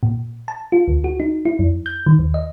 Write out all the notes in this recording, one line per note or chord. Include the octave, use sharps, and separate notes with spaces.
A#2
A5
F4
D2
F#4
D#4
E4
F2
G6
D#3
D#2
D#5